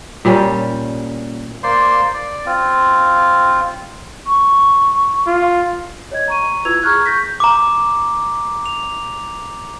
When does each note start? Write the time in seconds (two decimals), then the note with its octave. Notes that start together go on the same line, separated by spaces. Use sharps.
0.25 A#2 G3 C#4
1.63 A#3 C5 D5 C6
2.14 D5
2.46 C4 F4
4.26 C#6
5.27 F4
6.11 C#5 D#5 G#6
6.28 A#5 C#6 D#7
6.65 E4 F4 B4 E6 G#6 F7
6.82 G#4 A#5 C#6 F6 F#6 G#6
7.06 C#6 G6 A#6 B6
7.40 A#5 D6
8.66 F7